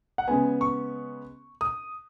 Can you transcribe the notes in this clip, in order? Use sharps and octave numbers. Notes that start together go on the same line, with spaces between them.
F#5
C#3 G#3 B3 G#5
C#6
D#6